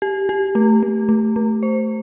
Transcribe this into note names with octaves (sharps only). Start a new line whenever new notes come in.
G4
G4
A3
A3
A3
A3
C5